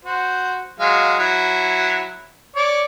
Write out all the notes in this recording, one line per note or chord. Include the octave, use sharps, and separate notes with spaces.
F#4 C5
F#3 G#3 F5
F#3 E4
C#5 D5 D6